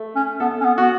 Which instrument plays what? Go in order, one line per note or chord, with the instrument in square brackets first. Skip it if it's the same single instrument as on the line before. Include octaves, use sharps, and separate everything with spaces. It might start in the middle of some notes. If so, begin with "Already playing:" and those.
Already playing: [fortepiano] A3
[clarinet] C#4
[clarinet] B3 [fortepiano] A4
[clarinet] C#4
B3
[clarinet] B3 [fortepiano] F#4